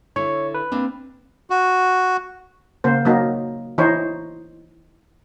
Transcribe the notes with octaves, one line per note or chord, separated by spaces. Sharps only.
D3 E4 C#5 C#6
B4
A#3 C4 D4
F#4
C#3 A#3 C5
F#3 A#3 D#4
E3 D#4 C5 C#5